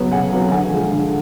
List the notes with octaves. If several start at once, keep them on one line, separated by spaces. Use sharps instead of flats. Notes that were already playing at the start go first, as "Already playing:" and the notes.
Already playing: C#3 F#3 B3
C#3 F#5 G#5
F#3 B3
D3 F#5 G#5
F3 G#3
D3